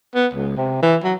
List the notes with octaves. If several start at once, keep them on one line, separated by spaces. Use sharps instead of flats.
B3
C#2
C3
E3
F#3